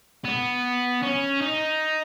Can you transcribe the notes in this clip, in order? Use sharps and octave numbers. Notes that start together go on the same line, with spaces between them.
B3
C#4
D#4